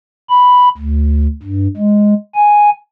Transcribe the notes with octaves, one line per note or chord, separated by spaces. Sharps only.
B5
D2
G2
G#3
G#5